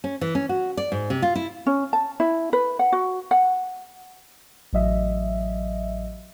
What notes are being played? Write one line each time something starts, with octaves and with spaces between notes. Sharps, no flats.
C#4
E3
C#4
F#4
D5
G#2
C3
F4
E4
C#4
A5
E4
B4
F#5
F#4
F#5
A1 F#3 D#5 E5